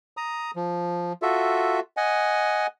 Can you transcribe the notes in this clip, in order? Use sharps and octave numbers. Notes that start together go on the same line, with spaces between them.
A#5 D#6
F3
F4 F#4 A4 E5
D#5 F#5 G#5